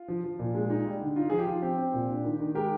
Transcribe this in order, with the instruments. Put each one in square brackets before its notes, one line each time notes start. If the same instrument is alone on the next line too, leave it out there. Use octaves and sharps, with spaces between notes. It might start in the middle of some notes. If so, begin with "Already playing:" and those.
Already playing: [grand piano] F4
F3
F3
A#2
G#3
D#4
G3
D3
D#4 F4
F3 G#4
G4
F3 F4
C4 G4
C4
A#2
D4
D#3
D#3
G#3 G4 A#4